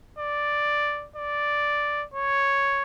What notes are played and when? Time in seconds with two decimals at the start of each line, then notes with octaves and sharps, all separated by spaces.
0.19 D5
1.16 D5
2.14 C#5